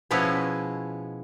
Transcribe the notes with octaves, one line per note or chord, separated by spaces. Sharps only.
B2 F3 G#3 C#4 E4 B4